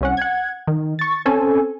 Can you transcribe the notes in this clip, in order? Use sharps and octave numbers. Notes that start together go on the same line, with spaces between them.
C2 C#4 F#5
F#5 G#6
D#3
C#6 A6
C4 C#4 A4 G#5